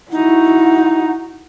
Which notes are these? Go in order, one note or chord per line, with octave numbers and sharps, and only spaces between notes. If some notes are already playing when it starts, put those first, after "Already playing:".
D#4 E4 F#4